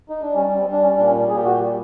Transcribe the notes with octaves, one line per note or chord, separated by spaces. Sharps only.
D#4
D4
G3 C#4
C4
G3
D4
C#4
A#2 D4
C#4
A#2 G#4
G4
F#4
G4
G3